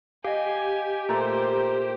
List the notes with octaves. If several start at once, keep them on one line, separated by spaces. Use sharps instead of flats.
G4 D#5 F5 G#5
A#2 A3 A#4 C5 A#5